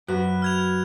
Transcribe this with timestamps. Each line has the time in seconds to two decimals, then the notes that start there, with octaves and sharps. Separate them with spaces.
0.08 F#2 F#4 B4 B5 F#6
0.42 F6 G#6 F7